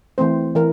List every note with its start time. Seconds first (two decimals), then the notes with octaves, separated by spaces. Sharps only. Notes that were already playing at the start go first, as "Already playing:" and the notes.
0.18 E3 A3 C4 C5
0.55 E3 A#4